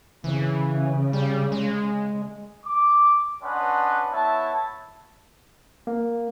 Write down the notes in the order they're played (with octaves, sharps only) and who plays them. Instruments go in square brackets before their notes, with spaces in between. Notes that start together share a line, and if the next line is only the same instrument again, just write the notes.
[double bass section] C#3 [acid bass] E3
[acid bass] G3
G#3
[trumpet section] D6
C#4 D4 B4 D#5 F#5 C6
B3 E4 C#5 E5 A5
[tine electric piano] A#3